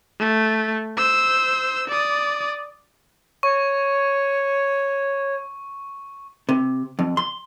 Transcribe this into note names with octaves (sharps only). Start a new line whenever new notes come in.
A3
C5 E6
D5 D#6
C#5 C#6
C3
F2
C6